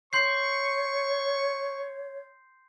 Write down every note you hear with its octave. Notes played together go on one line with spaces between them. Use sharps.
C#5 C6 C#6 G6 C7